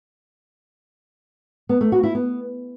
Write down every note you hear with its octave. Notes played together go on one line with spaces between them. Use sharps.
B3
A3
F#4
E4
B3